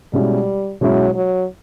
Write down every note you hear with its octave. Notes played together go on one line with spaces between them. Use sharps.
B2 G3 G#3 C#4 E4
B2 F#3 G#3 C#4 E4
F#3